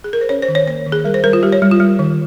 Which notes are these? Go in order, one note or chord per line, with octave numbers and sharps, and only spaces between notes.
G#4
A#4
C5
C#4 C#5
C5
D#3
C#5
A#3 C#5
D#3
G#4
G3 A#4
C5
G3 A#4
F4
G3 G4
C#5
G3
F4
G3
D#3